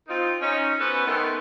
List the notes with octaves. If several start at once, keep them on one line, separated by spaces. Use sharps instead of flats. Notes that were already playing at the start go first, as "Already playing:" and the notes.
C4 D#4 F4
C#4 D#4
B3 C#4 F#4 A4 B4 C5
D#3 G#3 A3 B3